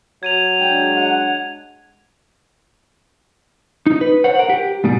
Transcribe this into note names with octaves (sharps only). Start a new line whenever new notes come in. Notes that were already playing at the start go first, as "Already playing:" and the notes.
F#3 G#6 D#7 F7
G#3 D4 G5
F#5
D#4
B4
C5 C#5 F#5
A#4 F#5
G4
G#2 B2 G3